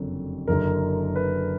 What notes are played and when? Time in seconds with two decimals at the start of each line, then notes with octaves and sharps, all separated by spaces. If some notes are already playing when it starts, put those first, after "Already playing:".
Already playing: F#1 F2 D3 F#3
0.47 F#1 F#2 D3 A#4
1.16 B4